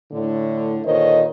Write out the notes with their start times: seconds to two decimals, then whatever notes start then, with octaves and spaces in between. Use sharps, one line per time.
0.12 A2 D3
0.85 A#2 D3 D#3 C5 C#5 D#5